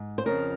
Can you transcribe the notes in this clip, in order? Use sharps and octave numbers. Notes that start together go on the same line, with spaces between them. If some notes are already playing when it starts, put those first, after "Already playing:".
Already playing: G#2
C5
F2 C#3 F3 A#4